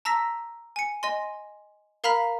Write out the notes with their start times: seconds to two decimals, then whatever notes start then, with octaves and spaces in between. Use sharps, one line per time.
0.05 A5 A#5 E6 A#6 B6
0.76 G#5 C#7
1.03 D#5 G#5 C6
2.04 A#4 F5 A#5 B5 F6 B6